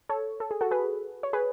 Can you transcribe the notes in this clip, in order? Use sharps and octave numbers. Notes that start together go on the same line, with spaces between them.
A4 C#5
A4
G#4
F#4 A4
G#4 B4
C#5
G#4 B4